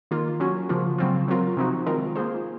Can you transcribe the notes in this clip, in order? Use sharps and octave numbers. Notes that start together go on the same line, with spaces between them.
D#3 A#3 F4
F#3 C#4 F#4
C#3 F3 A#3 F4
C#3 F#3 C4 F4
F#3 C4 F4 A#4
C3 F3 C4 D#4 F#4
D#3 G#3 C4 F4 A#4
A#3 F4 G#4 C5